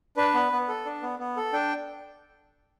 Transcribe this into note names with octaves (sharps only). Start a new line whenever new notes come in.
D4 B4
B3
B3
A4
D4
B3
B3
A4
D4 G5